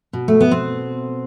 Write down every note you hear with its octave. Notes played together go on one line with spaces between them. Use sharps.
B2
A3
B3
C4